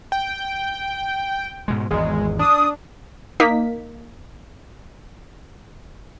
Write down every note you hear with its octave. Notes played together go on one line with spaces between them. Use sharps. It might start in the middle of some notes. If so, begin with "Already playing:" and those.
G5
G#2 B2 G#3
G#1 E2 G#3
D4 D#6
A#3 D#4 B6